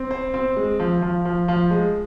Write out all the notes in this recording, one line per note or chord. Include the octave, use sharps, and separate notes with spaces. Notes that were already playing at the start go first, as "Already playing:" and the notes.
Already playing: C4
C5
C4
G#3
F3
F3
F3
F3
G#3